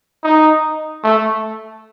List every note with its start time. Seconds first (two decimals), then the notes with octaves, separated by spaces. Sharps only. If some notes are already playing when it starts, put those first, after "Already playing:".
0.24 D#4
1.03 A3